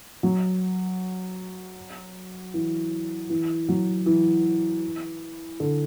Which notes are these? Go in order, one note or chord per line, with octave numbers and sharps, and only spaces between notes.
F#3
E3
E3
F#3
E3
D3